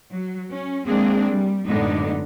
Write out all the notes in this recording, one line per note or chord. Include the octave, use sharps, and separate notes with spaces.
F#3
C#4
G#3 A#3 C4 D4 G#4
G3
F#2 A2 D3 G#3 B3 D#4